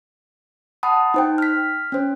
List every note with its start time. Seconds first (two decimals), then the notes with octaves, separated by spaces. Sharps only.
0.83 F#5 A5 B5 D#6
1.14 D#4 C5 G5
1.38 F6 B6
1.92 C#4 C5